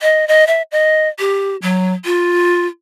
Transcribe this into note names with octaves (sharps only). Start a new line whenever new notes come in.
D#5
D#5
E5
D#5
G4
F#3
F4